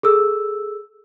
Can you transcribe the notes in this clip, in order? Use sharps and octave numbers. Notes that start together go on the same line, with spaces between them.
G#4 A4 E6